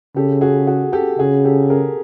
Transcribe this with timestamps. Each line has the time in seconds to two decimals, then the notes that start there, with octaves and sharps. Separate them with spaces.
0.16 C#3 G4 A4
0.41 F#4 G#4
0.67 F#4 G#4
0.93 G4 A4
1.19 C#3 F#4 G#4
1.45 G4 A4
1.70 G#4 A#4